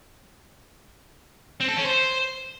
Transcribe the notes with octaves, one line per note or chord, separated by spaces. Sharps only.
C4
A4
C#4
C5